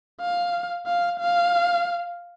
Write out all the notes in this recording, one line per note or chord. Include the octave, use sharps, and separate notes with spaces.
F5
F5
F5